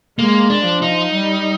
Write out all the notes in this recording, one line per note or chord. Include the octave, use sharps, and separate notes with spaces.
G#3 A#3
D4
F3
D#4
G3